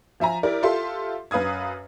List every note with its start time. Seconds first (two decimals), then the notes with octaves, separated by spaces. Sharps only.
0.20 F3 E5 G#5 A#5
0.43 E4 G4 A#4 D5
0.63 F4 G4 A4 E5 C6
1.31 F#2 B4 F5 D#6 G#6